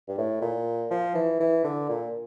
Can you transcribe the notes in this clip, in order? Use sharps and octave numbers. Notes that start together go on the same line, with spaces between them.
G2
A2
A#2
F3
E3
E3
D3
A#2